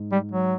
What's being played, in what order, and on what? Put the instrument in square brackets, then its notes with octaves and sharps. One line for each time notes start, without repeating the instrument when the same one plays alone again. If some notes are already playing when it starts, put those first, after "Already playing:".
Already playing: [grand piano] G#2
[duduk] G3
F#3